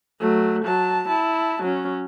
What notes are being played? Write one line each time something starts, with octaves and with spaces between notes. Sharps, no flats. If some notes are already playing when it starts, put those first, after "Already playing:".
F#3 A3
F#3 A5
E4 A5
F#3 C#4